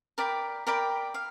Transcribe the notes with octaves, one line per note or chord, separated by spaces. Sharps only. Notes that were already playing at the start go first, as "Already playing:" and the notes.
A#4 D5 G5 B5
A#4 D5 G5 B5
F5